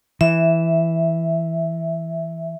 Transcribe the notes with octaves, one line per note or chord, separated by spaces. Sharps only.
E3 E5